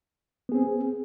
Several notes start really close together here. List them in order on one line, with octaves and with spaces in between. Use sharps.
B3 G#4 C4